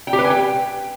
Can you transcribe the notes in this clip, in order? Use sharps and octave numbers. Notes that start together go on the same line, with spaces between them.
G5
G4
B4
G#5
G5